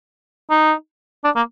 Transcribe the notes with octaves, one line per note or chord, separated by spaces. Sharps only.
D#4
D4
A#3